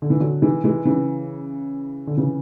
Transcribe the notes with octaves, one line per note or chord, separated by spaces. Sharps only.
D3
E3
D3 F#3
E3 G#3
E3 G#3
C#3 E3
D3
C#3 E3